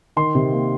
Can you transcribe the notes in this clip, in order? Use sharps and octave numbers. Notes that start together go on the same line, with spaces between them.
D#3 C6
C3
A#3